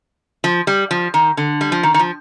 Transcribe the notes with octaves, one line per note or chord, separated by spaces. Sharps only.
F3
G3
F3
D#3
D3
G3
F3
D#3
D#3
F3